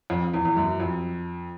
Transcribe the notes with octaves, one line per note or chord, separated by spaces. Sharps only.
F2
E2
E2
F#2
F2